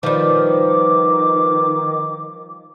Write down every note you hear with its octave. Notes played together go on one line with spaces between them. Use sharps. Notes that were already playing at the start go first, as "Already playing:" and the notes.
D#3 F3 G3 B4 D6